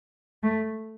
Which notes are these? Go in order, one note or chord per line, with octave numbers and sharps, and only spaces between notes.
A3